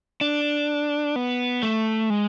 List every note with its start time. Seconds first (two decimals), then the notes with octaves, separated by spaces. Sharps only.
0.21 D4
1.16 B3
1.63 A3
2.10 G#3